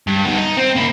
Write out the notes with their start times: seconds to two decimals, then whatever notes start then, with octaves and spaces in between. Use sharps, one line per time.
0.07 G2
0.25 B3 D#4
0.38 D#4
0.57 C4
0.76 A#3 E4